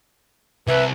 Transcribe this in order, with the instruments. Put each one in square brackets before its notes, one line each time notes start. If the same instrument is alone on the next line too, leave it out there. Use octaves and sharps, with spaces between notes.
[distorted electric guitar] C2 [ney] B4 [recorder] E5